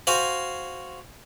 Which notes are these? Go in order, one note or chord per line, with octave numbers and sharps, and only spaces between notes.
F#4 C5 F5 G#5